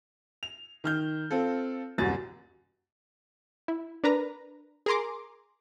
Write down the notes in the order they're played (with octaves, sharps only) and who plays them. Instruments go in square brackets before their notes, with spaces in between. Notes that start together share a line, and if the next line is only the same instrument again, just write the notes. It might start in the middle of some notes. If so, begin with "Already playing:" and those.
[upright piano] F7
D#3 F6 G6
C4 F4 A4
D#1 C2 F#2 A6
[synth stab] E4
D4 A#4 B4 A#5
G#4 A#4 A#5 C6 D6